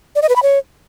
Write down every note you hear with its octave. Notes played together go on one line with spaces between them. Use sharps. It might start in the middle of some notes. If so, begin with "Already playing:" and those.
D5
D#5
B4
B5
C#5